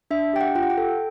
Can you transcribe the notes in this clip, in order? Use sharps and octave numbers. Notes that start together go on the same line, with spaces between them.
D4 E5
G4 G5
F#5
F4 G5
F#5
G5
A4